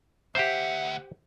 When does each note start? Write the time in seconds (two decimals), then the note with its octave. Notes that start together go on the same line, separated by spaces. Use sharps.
0.35 D2 G4 C5 E5 F#5